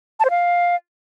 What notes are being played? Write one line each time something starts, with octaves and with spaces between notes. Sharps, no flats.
A5
C5
F5